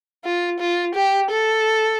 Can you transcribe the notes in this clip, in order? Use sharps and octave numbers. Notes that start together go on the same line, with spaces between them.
F4
F4
G4
A4